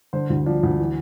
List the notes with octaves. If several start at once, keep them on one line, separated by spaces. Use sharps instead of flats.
D3 C5
D2
F3 D5
D2
E3